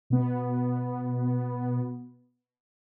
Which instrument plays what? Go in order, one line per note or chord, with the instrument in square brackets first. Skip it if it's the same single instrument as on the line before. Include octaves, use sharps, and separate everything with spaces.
[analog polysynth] B2 B3